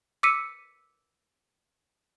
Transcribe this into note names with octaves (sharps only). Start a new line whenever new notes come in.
D6 E6 B6 C#7 D#7